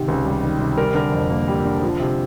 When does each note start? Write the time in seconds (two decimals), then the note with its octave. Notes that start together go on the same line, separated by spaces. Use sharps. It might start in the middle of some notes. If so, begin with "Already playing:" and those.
Already playing: G#2 C3 D#3
0.08 C#2
0.26 G3
0.42 D#3
0.60 C3
0.78 G3 A#4
0.95 D3 A#4
1.12 F2
1.30 A#3
1.48 G3
1.65 D3
1.82 F3
2.00 C3